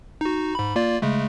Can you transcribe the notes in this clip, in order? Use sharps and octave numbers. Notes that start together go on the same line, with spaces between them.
D#4 F#4
G#2 B5
A#3 F4 D5
C#3 G#3 A3